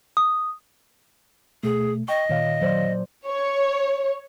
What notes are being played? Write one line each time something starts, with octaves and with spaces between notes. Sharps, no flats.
D#6
B2 A3 G#4
D#5 G5 C#6
A#2 D#3 C#5 F5
F#3 C5 D5
C#5